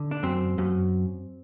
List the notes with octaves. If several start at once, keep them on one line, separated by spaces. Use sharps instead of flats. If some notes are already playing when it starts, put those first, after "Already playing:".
Already playing: D3
D4
F#2 C4
F#2